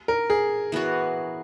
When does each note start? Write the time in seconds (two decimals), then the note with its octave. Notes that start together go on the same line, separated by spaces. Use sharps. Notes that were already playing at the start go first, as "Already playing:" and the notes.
0.08 A#4
0.30 G#4
0.72 E3 B3 F#4 C#5